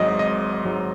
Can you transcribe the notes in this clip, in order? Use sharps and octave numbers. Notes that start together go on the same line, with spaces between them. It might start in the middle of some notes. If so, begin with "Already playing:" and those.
Already playing: G#1 G#2 F#3 D#5
G#1 D#5
G#2 F#3